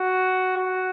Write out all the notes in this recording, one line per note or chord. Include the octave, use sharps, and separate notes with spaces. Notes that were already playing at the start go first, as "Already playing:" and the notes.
Already playing: F#4
F#4